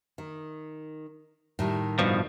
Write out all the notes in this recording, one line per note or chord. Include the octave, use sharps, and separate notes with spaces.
D#3
A2 D#3 G3
G2 B2 F3